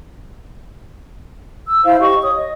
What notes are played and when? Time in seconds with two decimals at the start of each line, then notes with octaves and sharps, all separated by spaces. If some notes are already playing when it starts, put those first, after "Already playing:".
1.67 E6
1.84 E4 C5 F5
2.01 G4 D#5 C#6
2.22 C#5 D#6
2.35 D#5